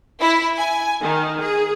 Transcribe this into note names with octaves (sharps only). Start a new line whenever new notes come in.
E4
G#5
D#3
G#4